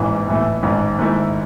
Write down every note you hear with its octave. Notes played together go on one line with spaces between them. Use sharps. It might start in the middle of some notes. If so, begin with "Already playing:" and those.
Already playing: A1 G#2 E3
A2 E3 A3 E4
A1 G#2 D#3
G#2 D#3 A3 E4